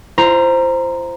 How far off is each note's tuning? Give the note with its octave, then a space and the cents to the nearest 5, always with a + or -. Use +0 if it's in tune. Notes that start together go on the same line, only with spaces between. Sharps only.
F4 -45 C5 +0 A#5 +0